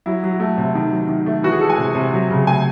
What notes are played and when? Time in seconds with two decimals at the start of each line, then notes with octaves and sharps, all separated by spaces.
0.06 F#3 E4
0.24 F#3
0.40 A3
0.58 C3
0.75 D#3
0.92 F#3
1.09 D#3
1.26 A3
1.43 E3 F#4
1.52 G#4
1.61 G#3 A4
1.70 G#5
1.78 C3
1.95 C3
2.13 F#3
2.30 C#3
2.47 A3 G#5